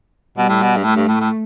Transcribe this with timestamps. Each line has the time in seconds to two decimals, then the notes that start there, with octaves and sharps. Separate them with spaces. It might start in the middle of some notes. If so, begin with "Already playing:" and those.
0.38 B2 G3
0.49 A2
0.62 B2
0.77 G2
0.84 A2 A3
0.96 G2
1.08 A2
1.20 A2